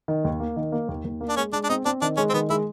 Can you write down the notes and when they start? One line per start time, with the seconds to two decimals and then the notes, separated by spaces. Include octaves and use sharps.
0.08 D#3
0.24 D#2
0.40 A#3
0.56 D#3
0.72 A#3
0.88 D#2
1.05 D#2
1.21 A#3
1.29 D4
1.37 G#3 C#4
1.53 G#3 D4
1.64 D4
1.69 C4 D#4
1.85 C4 D4
2.01 D#3 D4
2.17 G#3 C#4
2.29 C4
2.33 D#3 B3
2.50 G#3 E4